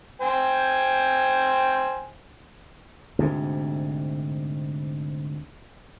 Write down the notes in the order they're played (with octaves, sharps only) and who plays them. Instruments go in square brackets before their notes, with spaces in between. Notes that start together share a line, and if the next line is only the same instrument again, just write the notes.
[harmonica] C5 G5 G#5
[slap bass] D2 G#2 C3